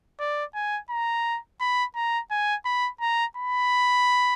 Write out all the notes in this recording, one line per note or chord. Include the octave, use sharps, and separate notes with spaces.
D5
G#5
A#5
B5
A#5
G#5
B5
A#5
B5